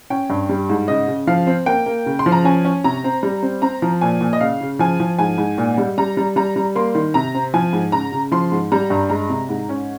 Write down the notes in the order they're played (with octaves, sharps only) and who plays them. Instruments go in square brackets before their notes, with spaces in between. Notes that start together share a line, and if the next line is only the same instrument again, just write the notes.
[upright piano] C#4 G5
G2
G3
G#2
C#3 D#5
C#3
F3 F5
C4
A#3 G5
A#3
C#3
C6
F3
A#5
C#4 G#5
C#4
C3 A#5
C4
G3
C4
C4 A#5
F3
A#2 G#5
A#2
D#5
C#3 F5
C#3
F3 G#5
F3
G#2 G#5
G#2
A#2
G3
G3 A#5
G3
G3 A#5
G3
A#3 C6
D#3
C3 A#5
C4
F3 G#5
G#2
C#3 A#5
C#3
F3 C6
G#2
G3 A#5
G2
G#3 A#5
C3
G#2
C#4